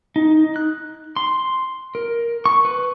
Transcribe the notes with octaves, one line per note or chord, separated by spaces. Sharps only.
D#4
F#6
C6
A#4
C#6
B4